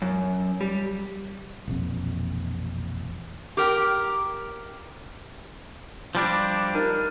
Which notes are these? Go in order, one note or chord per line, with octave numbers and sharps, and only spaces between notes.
F#2
G3
E1 A#1 F2
G4 A#4 G5
F3 G3 D4
D#4 A#4